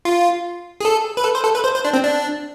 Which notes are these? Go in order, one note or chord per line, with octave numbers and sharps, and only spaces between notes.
F4
G#4
A4
B4
A4
C5
A4
B4
C5
C5
D4
C4
D4